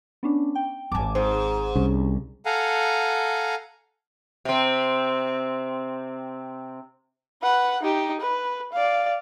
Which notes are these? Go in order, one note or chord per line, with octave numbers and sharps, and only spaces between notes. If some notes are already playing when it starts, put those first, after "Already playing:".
B3 C#4 D4
G5
D#1 G#1 G#5 A5 D6
G#2 C5
C2 C#4
A4 F5 F#5 G#5 A#5
C3 C4
B4 F#5
D#4 G4
B4
D5 F5